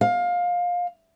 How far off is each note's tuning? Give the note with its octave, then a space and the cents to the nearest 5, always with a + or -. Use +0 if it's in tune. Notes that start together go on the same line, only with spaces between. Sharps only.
F5 +20